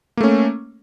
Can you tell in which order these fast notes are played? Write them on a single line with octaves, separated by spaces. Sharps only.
A#3 A3 C#4